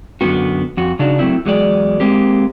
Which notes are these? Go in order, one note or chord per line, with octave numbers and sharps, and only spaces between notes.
F#2 A#2 D3 B3 F#4
F2 F#4
C#3 D4 D#4 F#4
F#3 A3 C4 E4
E2 F#3 G#3 D5
G#3 A#3 C4 G4